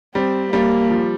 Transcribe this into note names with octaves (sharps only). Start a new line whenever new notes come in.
G3 C4
G3 A#3
F3